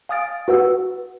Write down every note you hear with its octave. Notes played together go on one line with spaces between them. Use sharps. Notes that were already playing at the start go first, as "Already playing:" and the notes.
F5 G#5 D#6 F6 A6 D7
F#4 B4 F#5 E6